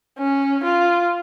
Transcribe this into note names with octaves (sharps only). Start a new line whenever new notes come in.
C#4
F4